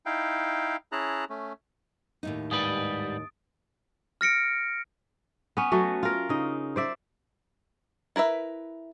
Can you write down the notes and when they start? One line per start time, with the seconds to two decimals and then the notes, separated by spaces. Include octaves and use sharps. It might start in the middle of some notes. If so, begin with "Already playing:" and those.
0.06 D#4 E4 F5 G5
0.92 C#4 E4 G#4 A5 A#5 F#6
1.30 A3 C#4
2.23 D#2 A2 D#4
2.51 G#2 G3 B4 D#6 A6 D7
4.21 F6 A#6 C#7 D7
5.57 B3 C#4
5.72 F#3 A3 F#4
6.03 F4 A#4
6.29 C#3 D#4
6.76 C5 D5 E5
8.16 E4 A#4 B4 E5